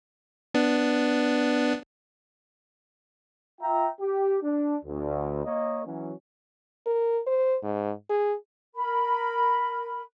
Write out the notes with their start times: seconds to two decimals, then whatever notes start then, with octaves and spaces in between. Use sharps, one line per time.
0.54 B3 D4
3.61 F4 E5 G5 A#5
4.00 G4
4.42 D4
4.85 D2
5.45 A#3 C#5 D#5
5.85 E3 F#3 C#4
6.86 A#4
7.27 C5
7.63 G#2
8.10 G#4
8.74 A#4 B5